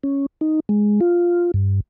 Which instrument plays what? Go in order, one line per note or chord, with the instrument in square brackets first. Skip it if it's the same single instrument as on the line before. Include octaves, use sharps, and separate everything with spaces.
[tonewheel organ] C#4
D#4
G#3
F4
G2